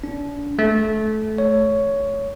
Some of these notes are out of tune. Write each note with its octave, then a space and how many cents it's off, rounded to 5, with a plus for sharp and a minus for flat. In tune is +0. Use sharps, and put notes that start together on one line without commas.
D4 -35
A3 -20
C#5 +10